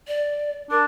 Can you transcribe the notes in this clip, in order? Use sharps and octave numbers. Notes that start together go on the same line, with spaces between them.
D5
D4 A#4